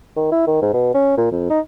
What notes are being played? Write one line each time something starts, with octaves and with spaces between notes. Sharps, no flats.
D#3
E4
D#3
G#2
B2
C#4
A#2
F2
D#4